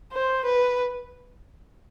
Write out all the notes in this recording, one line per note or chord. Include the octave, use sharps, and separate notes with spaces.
C5
B4